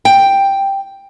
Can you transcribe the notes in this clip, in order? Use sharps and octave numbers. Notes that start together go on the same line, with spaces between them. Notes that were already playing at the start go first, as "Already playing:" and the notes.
G5